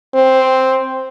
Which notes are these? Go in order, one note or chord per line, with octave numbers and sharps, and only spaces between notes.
C4